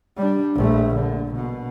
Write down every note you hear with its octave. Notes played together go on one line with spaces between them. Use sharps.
G3 D4
A#1 A3
D3
B2